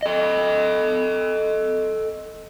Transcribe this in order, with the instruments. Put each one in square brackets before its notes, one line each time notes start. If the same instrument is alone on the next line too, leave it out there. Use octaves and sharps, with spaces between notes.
[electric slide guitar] A4 D#5